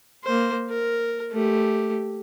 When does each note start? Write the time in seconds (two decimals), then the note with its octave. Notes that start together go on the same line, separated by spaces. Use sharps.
0.24 A#3 C5
0.69 A#4
1.32 A3 G4